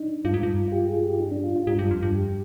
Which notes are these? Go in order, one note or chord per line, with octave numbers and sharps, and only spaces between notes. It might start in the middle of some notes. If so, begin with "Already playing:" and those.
Already playing: D4 D#4
G2 F4
G#2
G2
F4
G4
G#4
G4
D#4
D4
F4
F4
G#2 G4
G2
F2
G2
G4